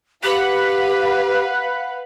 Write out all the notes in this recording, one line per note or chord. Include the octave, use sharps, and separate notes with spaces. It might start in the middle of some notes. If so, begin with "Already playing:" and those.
G4 B4 F5 F#5 B5 F#6